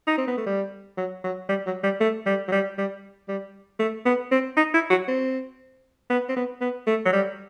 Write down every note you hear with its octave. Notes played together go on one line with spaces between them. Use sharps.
D#4
C4
B3
A3
G3
F#3
F#3
G3
F#3
G3
A3
G3
F#3
G3
G3
G3
A3
B3
C4
D#4
E4
F#4
C4
B3
C4
B3
B3
A3
F#3
G3